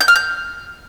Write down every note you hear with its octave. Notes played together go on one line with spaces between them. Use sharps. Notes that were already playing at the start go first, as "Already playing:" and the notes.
G6
F6
G6